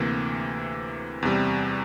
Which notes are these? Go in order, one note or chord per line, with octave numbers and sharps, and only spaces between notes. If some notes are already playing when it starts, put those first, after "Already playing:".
Already playing: D2 C3 E3 A#3
E2 C3 G3